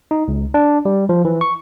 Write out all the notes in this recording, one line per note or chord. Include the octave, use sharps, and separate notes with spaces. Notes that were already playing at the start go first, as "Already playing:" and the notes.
D#4
C#2
D4
G3
F3
E3
C#6